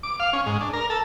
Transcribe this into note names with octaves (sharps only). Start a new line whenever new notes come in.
D6
F5
C#4
G#2
D4
A#4
A4